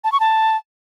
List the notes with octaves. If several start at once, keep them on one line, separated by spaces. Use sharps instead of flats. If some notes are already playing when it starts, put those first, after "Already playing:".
A5
C#6
A5